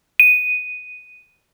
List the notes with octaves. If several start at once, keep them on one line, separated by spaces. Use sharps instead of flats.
D#7